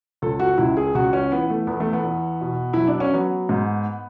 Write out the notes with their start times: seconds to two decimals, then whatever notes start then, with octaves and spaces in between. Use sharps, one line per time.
0.22 C#2 A4
0.39 F#4
0.58 C#2 E4
0.77 G#4
0.95 C#2 F#4
1.13 C#4
1.31 E3 B3
1.50 A3
1.67 E2 B3
1.80 A3
1.93 B3
2.03 E2
2.41 B2
2.73 F#3 E4
2.88 D4
3.00 C#4
3.13 F#3 B3
3.49 G#2